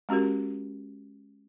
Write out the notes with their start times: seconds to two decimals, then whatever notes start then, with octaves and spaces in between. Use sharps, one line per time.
0.09 G#3 C#4 F#4 G4 A#4